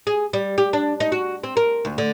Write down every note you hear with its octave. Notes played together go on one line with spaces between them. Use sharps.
G#4
G3
G4
D4
D#4
F#4
C4
A#4
D2
D3